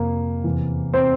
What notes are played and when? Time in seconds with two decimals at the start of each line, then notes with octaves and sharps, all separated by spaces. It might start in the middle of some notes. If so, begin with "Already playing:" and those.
Already playing: F2 C3 F3 A#3 A#4
0.44 E2 C3 E3
0.94 C4 C5